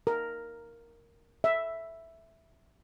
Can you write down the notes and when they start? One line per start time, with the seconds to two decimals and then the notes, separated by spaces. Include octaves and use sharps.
0.07 A#4
1.44 E5